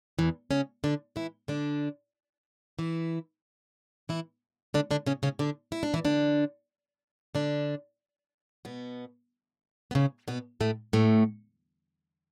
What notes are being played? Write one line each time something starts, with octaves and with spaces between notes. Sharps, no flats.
E2 E3
C#3 C#4
D3 D4
E3 E4
D3 D4
E3 E4
E3 E4
D3 D4
D3 D4
C#3 C#4
C#3 C#4
D3 D4
E4
D4
E3 E4
D3 D4
D3 D4
B2 B3
B3
C#3 C#4
B2 B3
A2 A3
A2 A3